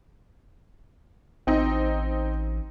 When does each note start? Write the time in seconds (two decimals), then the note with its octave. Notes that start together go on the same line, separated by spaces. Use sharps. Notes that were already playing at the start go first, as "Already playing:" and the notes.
1.47 A1 C4 D#4